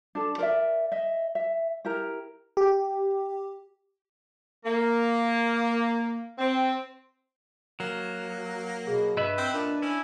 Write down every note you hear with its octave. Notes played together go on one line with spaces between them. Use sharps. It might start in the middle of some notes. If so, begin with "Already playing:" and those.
D4 A4
A#4 D5 E5
D#5 E5
E5
E4 G4 A#4 A#5
G4
A#3
C4
F#3 A#3
B2 G#4
G2 B4 D#5 E5 B5
C4
A#2 D4
C#4 E4